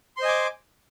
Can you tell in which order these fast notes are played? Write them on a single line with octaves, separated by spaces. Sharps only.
C6 C5 D#5 G#5 D6